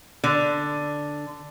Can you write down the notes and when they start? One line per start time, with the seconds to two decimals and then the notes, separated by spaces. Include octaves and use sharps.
0.24 D3